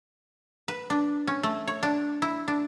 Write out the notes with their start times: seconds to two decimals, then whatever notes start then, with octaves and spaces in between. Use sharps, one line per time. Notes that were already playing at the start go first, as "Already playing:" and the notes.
0.68 B4
0.90 D4
1.27 C#4
1.43 A3
1.67 C#5
1.83 D4
2.22 E4
2.48 D4